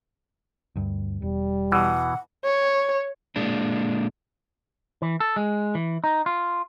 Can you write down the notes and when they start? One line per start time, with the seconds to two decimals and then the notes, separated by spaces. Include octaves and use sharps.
0.76 D2 G2
1.22 E1 G3
1.72 B2 E3 F#5
2.45 C#5
3.36 A#2 G#3 A#3 D4
5.02 E3
5.20 A4
5.36 G#3
5.75 E3
6.04 D#4
6.26 F4